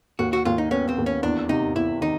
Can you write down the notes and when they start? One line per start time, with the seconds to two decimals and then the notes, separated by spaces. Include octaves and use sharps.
0.19 D#2 F#4
0.33 F#4
0.45 D#2 F4
0.58 D#4
0.71 B3 C#4
0.89 C4
0.98 D#2
1.06 C#4
1.23 E2 D4
1.49 C3 D#4
1.75 E2 E4
2.01 D#3 D#4